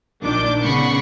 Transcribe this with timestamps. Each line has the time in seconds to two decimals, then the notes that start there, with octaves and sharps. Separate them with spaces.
0.22 A#1 A#2 D#3 D4 D6 G6
0.62 C#3 B3 F#5 B5 C#6 C7